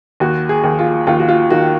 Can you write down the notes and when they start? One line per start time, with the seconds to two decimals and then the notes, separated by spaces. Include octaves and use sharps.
0.20 D#2 F#4
0.49 G#4
0.64 D#2
0.79 F4
1.07 D#2 F4
1.20 F#4
1.28 F4
1.50 D#3 F#4